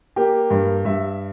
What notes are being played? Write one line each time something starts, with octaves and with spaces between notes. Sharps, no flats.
A#3 G4
G2
G2 E5